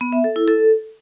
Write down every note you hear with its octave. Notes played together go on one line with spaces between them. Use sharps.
B3
E5
A4
E4
A4